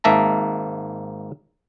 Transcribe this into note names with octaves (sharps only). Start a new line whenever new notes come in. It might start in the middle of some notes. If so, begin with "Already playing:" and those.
G#1 G#2 A#3 E5 A5 A#5